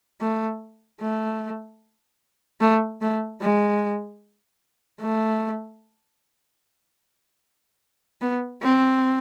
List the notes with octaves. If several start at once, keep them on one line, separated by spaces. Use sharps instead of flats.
A3
A3
A3
A3
G#3
A3
B3
C4